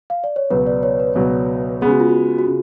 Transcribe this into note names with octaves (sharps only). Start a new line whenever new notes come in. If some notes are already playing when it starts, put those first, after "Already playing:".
F5
D5
C#5
C#2 B2 F#3 B4
D5
C#5
B4
C#2 B2 F#3
C#3 G#3 B3 G#4
F#4
F4
F#4
F#4
C#3